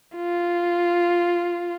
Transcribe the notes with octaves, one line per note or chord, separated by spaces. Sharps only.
F4